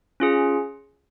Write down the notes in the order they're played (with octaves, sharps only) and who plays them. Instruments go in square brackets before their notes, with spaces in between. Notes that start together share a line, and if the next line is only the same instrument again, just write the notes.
[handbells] C#4 F4 G#4